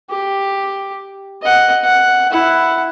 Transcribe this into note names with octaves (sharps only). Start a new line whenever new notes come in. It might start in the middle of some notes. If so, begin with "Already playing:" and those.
G4
D#5 F#5
F#5
E4 F#5